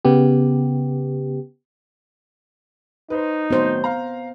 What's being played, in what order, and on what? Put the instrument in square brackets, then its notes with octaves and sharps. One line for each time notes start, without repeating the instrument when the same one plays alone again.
[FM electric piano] C#3 B3 G4
[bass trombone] D#4 [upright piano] B4 C5
[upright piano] A2 D#3 F#3 [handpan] B3 C5
[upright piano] F5 A#5